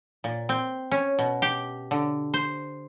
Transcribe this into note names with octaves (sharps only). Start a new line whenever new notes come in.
A#2
C4
C#4
B2
G4
D3
C5